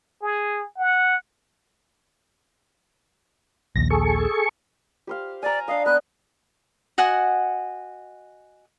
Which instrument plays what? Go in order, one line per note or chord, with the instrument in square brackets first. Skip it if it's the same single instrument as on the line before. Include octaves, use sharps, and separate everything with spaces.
[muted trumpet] G#4
F#5
[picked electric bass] A#1 D#2 [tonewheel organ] A#6
[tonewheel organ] G#4 A4 C#6
[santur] G4 C5 F5
[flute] D5 [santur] G#5 A#5
[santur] D4 D#5 [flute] F5
[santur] B3 [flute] F#6
[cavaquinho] F#4 D#5 F#5 G#5